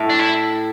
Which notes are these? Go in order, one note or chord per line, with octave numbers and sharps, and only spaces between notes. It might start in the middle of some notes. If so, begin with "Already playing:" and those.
Already playing: A2
D4
E4